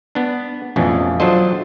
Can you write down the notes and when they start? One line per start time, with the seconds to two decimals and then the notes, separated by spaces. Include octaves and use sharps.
0.15 B3 D4
0.76 A1 F2 B2 E3 C#4 D4
1.20 F#3 D4 F4 A4 C5 D#5